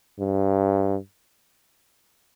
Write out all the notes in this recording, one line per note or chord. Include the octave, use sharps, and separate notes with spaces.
G2